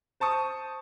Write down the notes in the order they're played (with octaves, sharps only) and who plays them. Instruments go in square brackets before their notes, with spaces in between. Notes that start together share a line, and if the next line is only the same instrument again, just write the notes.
[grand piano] C5 A5 C#6 D#6